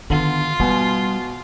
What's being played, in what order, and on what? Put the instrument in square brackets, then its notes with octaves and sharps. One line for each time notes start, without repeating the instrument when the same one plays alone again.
[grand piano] D3 B3 [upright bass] D#3 [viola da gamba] F4
[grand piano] B2 B3 G#5 [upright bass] G3